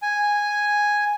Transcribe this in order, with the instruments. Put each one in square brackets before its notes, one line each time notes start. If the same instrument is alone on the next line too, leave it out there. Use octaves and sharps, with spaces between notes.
[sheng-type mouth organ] G#5